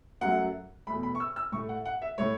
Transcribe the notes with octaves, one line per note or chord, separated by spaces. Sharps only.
F#2 F#3 A3 F#5
E2 B2 A3 B5
B5
C#6
E6
E6
A2 A3 C#6
F#5
F#5
E5
A2 A3 C#5